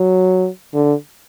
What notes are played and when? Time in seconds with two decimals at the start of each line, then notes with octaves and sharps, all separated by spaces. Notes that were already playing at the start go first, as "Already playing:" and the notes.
Already playing: F#3
0.74 D3